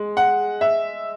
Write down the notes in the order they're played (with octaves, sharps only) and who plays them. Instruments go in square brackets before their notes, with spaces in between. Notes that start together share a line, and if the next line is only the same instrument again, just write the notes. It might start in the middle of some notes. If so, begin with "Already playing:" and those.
Already playing: [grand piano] G#3
[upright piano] F#5
E5